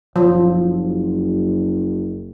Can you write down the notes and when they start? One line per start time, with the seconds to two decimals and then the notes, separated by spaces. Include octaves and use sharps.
0.16 F#1 F3